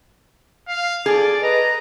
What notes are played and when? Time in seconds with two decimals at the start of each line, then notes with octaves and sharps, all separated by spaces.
0.68 F5
1.06 G#4 A4 D5
1.43 B4 D#5 A#5